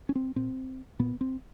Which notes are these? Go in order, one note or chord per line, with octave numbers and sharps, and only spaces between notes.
C#4
C4
A#2 C4
A#2 B3
C4